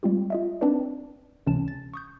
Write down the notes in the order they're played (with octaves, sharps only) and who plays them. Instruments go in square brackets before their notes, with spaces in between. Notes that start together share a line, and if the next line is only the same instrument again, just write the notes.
[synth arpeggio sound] G3 G#3 C4 F4 G4
F4 D#5 E5
C4 D4 D#4 B4 D5
C#2 C3 E3 C#4 A5 E7
A6
C#6 D#6 G6